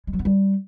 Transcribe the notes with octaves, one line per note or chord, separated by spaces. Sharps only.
G#3
F#3
B3
G3